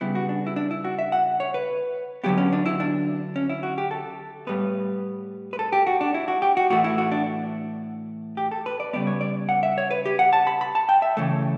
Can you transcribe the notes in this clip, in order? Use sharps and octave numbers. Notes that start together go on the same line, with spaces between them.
C#3 G3 B3 E4
F#4
D4
E4
D4
E4
F#4
E5
F#5
C#5
B4
D3 F#3 B3 G4
C#4
D4
E4
D4
C#4
E4
F#4
G4
A4
A2 G3 B3 B4
B4
A4
G4
F#4
D4
E4
F#4
G4
F#4
A2 E3 A3 F#4
E4
F#4
D4
G4
A4
B4
D5
C#3 G3 B3 D5
C#5
D5
F#5
E5
C#5
B4
G4
F#5
A5
B5
B5
A5
G5
E5
C#3 E3 A3